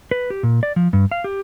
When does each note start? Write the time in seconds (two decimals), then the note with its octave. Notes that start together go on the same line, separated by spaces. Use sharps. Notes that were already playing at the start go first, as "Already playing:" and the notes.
0.11 B4
0.30 G4
0.43 A#2
0.63 D5
0.76 F3
0.93 G2
1.11 F5
1.24 G4